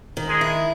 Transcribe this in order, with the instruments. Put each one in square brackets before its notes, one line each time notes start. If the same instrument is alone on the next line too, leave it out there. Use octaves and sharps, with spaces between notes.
[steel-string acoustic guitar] D#3
[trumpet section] G#3 G#4
[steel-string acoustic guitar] E4